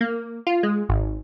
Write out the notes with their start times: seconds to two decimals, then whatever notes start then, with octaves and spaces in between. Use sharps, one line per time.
0.01 A#3
0.47 F4
0.63 G#3
0.89 G#1